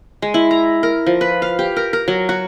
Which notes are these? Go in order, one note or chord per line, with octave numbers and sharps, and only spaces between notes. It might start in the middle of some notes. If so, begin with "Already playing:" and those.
G#3
E4
A#5
A#4
F3
B4
F5
G4
A#4
A#4
F#3
F#4